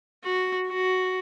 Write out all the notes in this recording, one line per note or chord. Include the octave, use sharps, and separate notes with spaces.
F#4
F#4